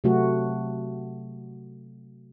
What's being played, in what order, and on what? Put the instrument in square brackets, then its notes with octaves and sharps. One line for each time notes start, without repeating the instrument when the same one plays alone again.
[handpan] C3 F#3 A3 F#4